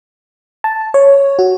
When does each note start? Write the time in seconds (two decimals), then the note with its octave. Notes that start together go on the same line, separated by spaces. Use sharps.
0.64 A5
0.94 C#5
1.39 F#4